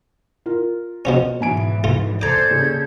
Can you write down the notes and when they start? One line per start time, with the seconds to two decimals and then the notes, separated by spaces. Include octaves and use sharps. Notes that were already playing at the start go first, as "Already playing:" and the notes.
0.46 F4 A#4
1.05 B2 F3 C#4
1.40 B1 G#2 E3 G#5 D7
1.84 A3 F4
2.21 A4 C5 D5 A#5 D6 G6 G#6
2.51 D#2 C#3 G#4